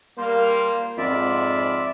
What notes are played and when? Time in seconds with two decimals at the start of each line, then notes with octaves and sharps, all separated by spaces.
0.18 G3 A#3 F4 C5
0.98 F2 G#2 F4 D5 E5 B5